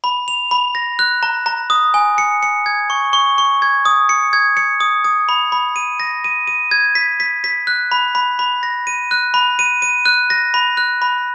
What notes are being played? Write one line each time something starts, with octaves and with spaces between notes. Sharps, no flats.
B5
F7
B5
A#6
F#6
A#5
A#5
D#6
G#5
C#7
C#7
G#6
C#6
C#6
C#6
G#6
D#6
C#7
G#6
C#7
D#6
D#6
B5
B5
D#7
A#6
D#7
D#7
G#6
B6
B6
B6
F#6
B5
B5
B5
A#6
D#7
F#6
B5
D#7
D#7
F#6
A#6
B5
F#6
B5